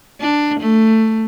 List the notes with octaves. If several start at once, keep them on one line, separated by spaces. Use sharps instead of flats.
D4
A3